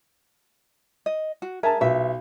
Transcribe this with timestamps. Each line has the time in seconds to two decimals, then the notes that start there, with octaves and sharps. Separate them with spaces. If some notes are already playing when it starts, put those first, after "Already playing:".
1.06 D#5
1.42 F#4
1.63 G#4 A#4 E5 A5
1.81 B1 F4 E5